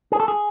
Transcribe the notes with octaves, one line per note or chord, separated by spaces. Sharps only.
G#4
A4
G#4